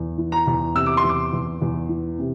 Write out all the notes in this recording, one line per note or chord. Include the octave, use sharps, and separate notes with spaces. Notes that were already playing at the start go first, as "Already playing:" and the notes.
Already playing: E2
E3
A#5
E2
C3 E6
D6
C6
E2
D6
E2
E2
E3
C3